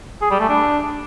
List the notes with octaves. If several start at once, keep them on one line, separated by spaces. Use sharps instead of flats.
G#4
G3
A3
D4